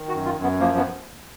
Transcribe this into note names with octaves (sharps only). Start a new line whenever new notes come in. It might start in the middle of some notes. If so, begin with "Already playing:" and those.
Already playing: D#3
F#4
F#2
F4
F#2
B3
F3 A#3
B3